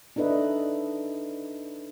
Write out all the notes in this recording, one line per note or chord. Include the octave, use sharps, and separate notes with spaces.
D4 D#4 A4 B4 D#5 E5